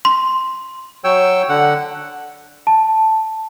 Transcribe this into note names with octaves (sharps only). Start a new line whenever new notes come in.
C6
F#3 C#5 G5 E6
D3 F#5
A5